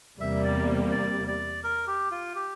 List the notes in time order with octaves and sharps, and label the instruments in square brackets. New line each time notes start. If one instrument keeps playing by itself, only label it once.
[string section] E2 C3 G3 A#3 [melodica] E5
[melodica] D5
D5
D5
A#4
G4
F4
G4